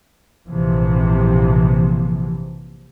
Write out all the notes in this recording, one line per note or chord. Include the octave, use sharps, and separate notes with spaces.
A#1 G#2 C3 E3 F3